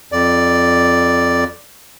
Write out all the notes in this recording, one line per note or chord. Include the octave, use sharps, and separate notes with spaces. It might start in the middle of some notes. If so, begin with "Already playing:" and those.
F2 D5